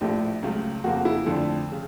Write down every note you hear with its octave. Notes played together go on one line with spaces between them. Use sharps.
A#1 A2 F3 A3 D4 G4
C#2 C#3 F#3 A3
F2 C#3 F3 A#3 F#4
E4
F2 D3 F3 A3 D4 A4
C#3